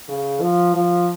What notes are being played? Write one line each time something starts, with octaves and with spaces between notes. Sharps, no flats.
C#3
F3
F3